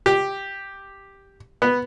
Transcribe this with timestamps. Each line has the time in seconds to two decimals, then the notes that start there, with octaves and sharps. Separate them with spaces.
0.06 G4
1.62 B3